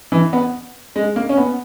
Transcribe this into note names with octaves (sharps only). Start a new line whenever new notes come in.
E3
B3
G#3
A#3
C#4
B3